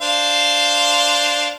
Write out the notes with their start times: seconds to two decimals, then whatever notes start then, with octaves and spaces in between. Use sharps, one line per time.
0.01 D4 C5 F5